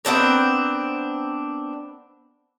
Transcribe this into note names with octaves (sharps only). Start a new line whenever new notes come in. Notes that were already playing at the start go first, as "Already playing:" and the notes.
B3 C4 D4 A#4